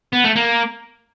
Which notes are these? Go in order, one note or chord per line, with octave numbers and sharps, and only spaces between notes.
B3
A3
A#3